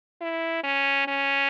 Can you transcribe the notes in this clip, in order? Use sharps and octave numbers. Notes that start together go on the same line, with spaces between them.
E4
C#4
C#4